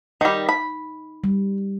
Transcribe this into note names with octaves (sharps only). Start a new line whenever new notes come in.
D#3 G3 D#4
B5
G3